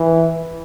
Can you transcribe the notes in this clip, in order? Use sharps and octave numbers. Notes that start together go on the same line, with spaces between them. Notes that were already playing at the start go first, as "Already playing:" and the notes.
Already playing: E3